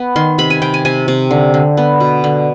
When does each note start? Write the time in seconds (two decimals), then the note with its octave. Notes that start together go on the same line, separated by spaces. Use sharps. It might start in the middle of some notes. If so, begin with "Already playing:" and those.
Already playing: B3
0.16 D#3 C6
0.38 C3 B5
0.50 G#5
0.62 C3 G5
0.74 G#5
0.85 C3 G#5
1.08 C3
1.31 D3
1.54 D3
1.77 B3
2.00 B2
2.24 D3